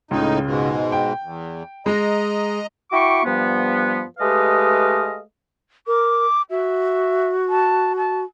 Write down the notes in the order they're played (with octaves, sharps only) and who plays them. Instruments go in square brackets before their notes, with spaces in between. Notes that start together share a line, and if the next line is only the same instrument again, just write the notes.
[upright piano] C#2 C#3 [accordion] A2 D#4
[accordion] G#2 B2 G#3
[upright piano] G5
[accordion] E2
[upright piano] G#3 [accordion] D#5 A#5
[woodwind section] E4 F#4 E5 G5 C#6 D6
G2 F3 G3 B3
G#3 A3 G4 B4 D#5 F5
[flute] A#4 [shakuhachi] D6
[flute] F#4 [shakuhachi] E5
[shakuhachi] A5
A5